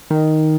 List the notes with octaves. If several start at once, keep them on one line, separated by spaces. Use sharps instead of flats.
D#3